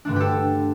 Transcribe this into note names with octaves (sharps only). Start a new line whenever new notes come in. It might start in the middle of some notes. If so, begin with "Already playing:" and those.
G2 D3 A3 D4
G4 A4